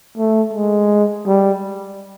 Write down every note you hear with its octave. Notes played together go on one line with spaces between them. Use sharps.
A3
G#3
G3